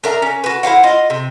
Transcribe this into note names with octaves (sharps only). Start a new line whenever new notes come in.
D4 A#4 E5 A#5
C#4
F#4 B4
E4 C5 F5 F#5
F4 D#5
C3